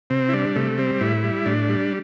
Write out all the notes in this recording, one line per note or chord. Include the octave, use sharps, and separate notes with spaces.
C3 C4
E4
G3 D4
C3 A3
G3 C4
A2 E4
G3
A2 D4
G3